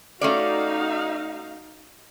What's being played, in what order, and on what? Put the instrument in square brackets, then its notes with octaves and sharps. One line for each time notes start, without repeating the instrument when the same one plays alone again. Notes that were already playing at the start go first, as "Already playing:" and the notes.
[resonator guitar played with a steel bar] A3 C#4 D5 [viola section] D#4 F#4 F5